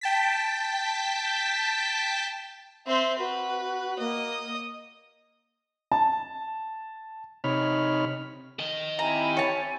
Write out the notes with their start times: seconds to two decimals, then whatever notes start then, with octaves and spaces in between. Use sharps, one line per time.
0.01 G5 A5 B6
2.87 C4 C5 E5
3.19 F#4 B4
3.99 A#3 D#5
5.92 A5
7.44 C3 D#4 C#5 B5 F6
8.59 D#3 D#5
8.99 C4 E4 G4 G#5 A#5
9.37 C#5 A5